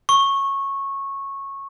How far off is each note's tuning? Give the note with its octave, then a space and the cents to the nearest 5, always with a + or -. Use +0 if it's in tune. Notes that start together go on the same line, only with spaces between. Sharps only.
C#6 -15